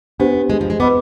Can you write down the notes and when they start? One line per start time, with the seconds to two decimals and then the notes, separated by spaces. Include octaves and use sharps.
0.20 B3 D4 G4 C5
0.50 G#3
0.61 F3
0.70 G#3
0.80 B3 B4 D#5 B5 D6